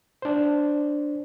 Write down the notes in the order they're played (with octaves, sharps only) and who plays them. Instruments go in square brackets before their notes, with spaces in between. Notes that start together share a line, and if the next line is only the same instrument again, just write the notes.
[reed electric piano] D4 C5